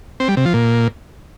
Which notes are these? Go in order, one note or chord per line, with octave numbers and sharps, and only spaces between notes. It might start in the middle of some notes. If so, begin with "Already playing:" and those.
C4
G3
C3
F3
A#2